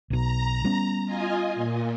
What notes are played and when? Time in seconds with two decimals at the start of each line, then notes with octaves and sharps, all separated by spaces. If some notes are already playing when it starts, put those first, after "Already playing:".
0.10 B1 B2 A#5
0.64 G3 B3 C#4
1.06 F4 D#5 G#5
1.55 A#2